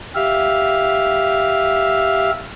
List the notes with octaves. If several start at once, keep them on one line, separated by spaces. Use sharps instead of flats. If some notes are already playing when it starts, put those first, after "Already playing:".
G4 E5 F5